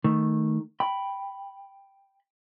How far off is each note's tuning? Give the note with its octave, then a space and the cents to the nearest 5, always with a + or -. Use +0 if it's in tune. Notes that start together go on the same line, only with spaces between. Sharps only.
D#3 +0 A3 +0
G5 +0 B5 +0